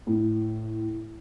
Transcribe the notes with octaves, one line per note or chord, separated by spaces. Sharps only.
A2